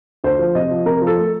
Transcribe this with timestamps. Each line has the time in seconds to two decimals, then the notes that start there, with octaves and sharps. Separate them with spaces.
0.24 D2 C5
0.39 F3
0.55 C3 D#5
0.71 F3
0.86 C3 A#4
1.02 F3
1.07 A4
1.17 A3